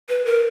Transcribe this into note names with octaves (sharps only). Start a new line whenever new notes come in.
B4
A#4